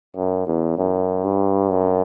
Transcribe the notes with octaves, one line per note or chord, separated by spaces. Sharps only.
F#2
E2
F#2
G2
F#2